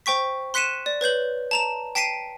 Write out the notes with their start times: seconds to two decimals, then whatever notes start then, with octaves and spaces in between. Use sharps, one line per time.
0.06 C5 G5 C#6 B6
0.54 C6 F#6 B6 C#7 D#7 E7
0.86 D5
1.01 B4 C#5 G6 F#7
1.51 A5 A#5 E7
1.95 G5 A5 B6 C7 D7 D#7